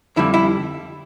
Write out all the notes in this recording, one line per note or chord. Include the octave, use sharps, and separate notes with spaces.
F2 D3 G3 E4
E4